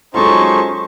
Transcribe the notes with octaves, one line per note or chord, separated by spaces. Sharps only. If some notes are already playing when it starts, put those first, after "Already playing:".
F#3 G#3 C#4 D#4 F4 A4 C5 C#6